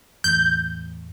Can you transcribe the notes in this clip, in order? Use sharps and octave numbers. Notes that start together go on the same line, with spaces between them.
E2 A2 G6